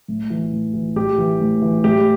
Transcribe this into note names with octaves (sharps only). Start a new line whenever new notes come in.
A2
E3
A2
E3
A2 G4
E3
A2
E3
A2 G4